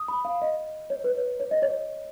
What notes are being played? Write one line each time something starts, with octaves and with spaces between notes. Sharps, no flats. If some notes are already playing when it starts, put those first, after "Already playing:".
Already playing: D#6
B5
F5
D#5
C#5
B4
C#5
C#5
D#5
C#5